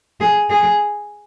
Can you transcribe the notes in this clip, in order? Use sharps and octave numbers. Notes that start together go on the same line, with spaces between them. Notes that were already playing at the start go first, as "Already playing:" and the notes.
G#4
G#4